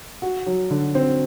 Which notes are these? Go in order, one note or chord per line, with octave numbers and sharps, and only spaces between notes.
F#4
F#3
D3
C4